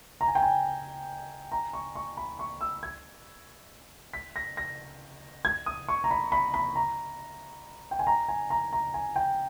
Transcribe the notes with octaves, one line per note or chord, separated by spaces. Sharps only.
A#5
G#5
G5
G#5
A#5
C#6
C#6
B5
C#6
E6
G#6
B6
A#6
A#6
G#6
D#6
C#6
A#5
B5
B5
B5
A#5
G5
G#5
A#5
G#5
A#5
A#5
G#5
G5